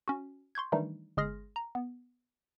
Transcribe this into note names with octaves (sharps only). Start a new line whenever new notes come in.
C#4 F#4
C6 C#6 G6 G#6
D#3 E3 G3 A3 D4 D#4
G1 G#3 G#4 C6 F6 A#6
A#5
B3